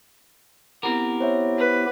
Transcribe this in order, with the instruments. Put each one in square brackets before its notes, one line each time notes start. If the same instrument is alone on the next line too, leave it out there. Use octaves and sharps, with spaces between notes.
[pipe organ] B3 E4 G4 [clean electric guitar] C4 A#4
[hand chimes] C5 C#5 E5
[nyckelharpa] B4